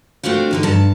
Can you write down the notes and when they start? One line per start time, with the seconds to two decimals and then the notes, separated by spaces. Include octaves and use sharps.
0.23 A3 C4 D4 F4 F#4
0.51 E2 D3 D#4
0.63 G2 A5